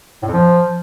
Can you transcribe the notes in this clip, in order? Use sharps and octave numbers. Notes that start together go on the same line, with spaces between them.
A2
F2
F3